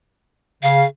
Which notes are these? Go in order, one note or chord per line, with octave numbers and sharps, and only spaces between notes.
C#3 F5